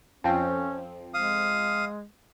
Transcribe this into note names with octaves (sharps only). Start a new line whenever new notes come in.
F2 F3 C4 C#4
G#3 F5 D#6